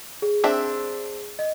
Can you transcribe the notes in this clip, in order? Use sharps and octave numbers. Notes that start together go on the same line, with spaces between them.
G#4
C4 D4 E5
D#5